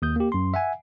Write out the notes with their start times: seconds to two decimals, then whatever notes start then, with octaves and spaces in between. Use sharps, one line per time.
0.02 D#2 D#6 G6
0.16 A#3 G4
0.32 F#2 C6
0.54 E5 F#5 G#5